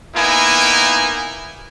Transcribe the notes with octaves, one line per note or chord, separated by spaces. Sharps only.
A#3 B3 D#4 E4 G#5